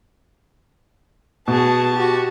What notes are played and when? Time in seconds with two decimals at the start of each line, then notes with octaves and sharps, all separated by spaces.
1.48 B2 B3 F#4 G#4 A5
1.94 F#4 G4